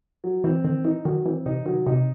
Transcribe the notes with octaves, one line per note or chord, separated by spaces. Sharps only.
F#3
E3 C4
D#3 C4
E3 D#4
D#3 F#3
E3 C4
C3 D#4
D#3 F#3
C3 D#4